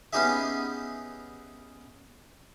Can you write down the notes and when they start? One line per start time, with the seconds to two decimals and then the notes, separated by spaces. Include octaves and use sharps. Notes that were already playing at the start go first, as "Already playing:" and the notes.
0.13 B3 C#4 D#4 G4 G#4 E5